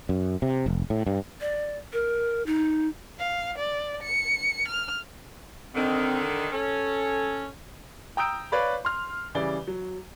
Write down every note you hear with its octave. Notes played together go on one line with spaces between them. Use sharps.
F#2
C3
F1
A2
G2
D5
A#4
D#4
F5
D5
C#7
F6
D3 D#3 C4
C#4 A4
G5 A#5 D#6 E6 G6 D7
B4 C#5 D5 F5 B5
C6 F6
C#3 E3 G3 D5 G7
F#3